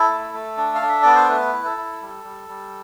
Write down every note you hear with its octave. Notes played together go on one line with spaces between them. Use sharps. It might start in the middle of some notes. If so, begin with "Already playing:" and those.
Already playing: E4 A4
A3
A3
D4
F5
D4
E5
B3 D5
C5
A3 B4
E4
A4
E4
G3
G3
G3